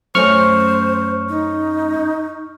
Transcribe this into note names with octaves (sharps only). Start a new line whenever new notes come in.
F#2 A3 C#4 C5 C#6 F6
D#4